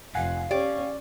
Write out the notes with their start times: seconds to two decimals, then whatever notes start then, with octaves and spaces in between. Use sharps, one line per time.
0.15 F1 F5 F#5 G#5 F#6
0.51 C#4 G4 D5